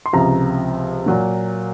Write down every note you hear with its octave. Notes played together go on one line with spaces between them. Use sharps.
C6
C#2 C3 F3 A#5
A#2 F#3 A#3